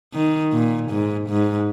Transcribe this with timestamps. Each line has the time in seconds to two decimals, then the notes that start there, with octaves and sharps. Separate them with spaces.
0.14 D#3
0.52 A#2
0.90 G#2
1.29 G#2